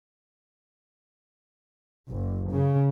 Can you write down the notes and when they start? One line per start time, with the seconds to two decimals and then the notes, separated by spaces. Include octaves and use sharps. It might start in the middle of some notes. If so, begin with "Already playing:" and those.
2.09 F#1
2.51 C#3